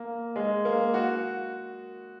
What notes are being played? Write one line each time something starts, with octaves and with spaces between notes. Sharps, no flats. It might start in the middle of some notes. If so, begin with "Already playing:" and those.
Already playing: A#3
G#3
A#3
F#4